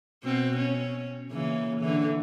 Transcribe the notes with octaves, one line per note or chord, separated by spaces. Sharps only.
B2 C4
C#4
A#2 C#3 E3
D3 E3